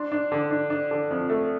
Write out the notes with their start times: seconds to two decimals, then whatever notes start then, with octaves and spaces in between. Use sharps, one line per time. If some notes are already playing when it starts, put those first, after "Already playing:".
Already playing: D4 C6
0.12 D4
0.32 D3
0.51 D4
0.70 D4
0.91 D3
1.11 F2
1.30 A3